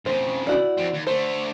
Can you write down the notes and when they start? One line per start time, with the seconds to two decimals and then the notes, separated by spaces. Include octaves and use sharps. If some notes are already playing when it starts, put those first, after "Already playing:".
0.06 F2 C#3 C5
0.47 E4 F#4 D5
0.78 F2 C4
0.93 D#2
1.07 D3 A3 C5